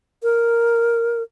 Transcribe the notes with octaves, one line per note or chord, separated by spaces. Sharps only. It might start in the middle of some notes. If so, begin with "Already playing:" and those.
A#4